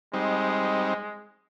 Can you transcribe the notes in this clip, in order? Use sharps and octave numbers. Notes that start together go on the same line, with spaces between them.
G3 G#3 C4 D#4